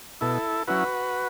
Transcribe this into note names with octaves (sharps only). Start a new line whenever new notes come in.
B2 E4 A4
F#3 C#4 E4 F#4 B4